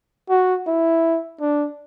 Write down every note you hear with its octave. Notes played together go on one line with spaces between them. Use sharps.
F#4
E4
D4